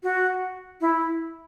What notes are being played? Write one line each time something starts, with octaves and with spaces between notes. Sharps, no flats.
F#4
E4